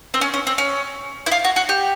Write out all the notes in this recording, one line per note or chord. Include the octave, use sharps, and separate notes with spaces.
C4
C#4
C#4
C4
C#4
E4
F4
F#4
F#4
G4